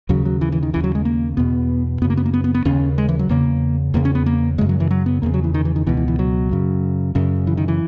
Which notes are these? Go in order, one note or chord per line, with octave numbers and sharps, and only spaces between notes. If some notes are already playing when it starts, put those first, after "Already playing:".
D#2 C#3 F#3
F#3
E3
E3
D#3
D#2 C#3 E3
F#3
G#3
A#3
E2 B2 B3
F#2 C#3 B3
A#3
B3
A#3
B3
B3
B3
D#2 C#3 C#4
G#3
E3
F#3
E2 C#3 A#3
E2 C#3 A#3
C#4
B3
A#3
F#2 C#3 G#3
F#3
E3
F#3
B3
E2 C#3 A#3
F#3
E3
D#3
E3
D#3
C#2 B2 E3
E3
E3
F#3
F#2 C#3
F#2 C#3
E3
D#3
E3